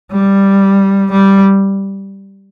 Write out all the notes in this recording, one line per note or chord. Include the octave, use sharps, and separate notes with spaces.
G3
G3